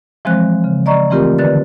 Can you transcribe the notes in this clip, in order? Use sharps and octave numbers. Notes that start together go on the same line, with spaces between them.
E3 F3 G#3 C4 C5 F#6
C#3
D5 D#5 A#5 C#6
E3 A3 C4 F4 G4 A#4
D3 D#3 B4 D5 A6